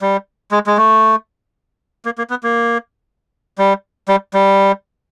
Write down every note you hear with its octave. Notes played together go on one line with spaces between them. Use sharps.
G3
G#3
G#3
A3
A#3
A#3
B3
A#3
G3
G3
G3